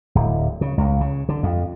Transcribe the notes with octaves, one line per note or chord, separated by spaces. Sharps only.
D1
C#3
C#2
C#3
D3
F2